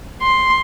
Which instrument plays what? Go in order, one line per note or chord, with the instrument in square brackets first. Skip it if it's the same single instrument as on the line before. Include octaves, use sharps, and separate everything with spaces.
[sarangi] C6